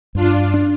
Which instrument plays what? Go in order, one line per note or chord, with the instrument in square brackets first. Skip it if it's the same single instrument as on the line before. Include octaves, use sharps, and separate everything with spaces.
[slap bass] G2 [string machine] D4 F4
[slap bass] D4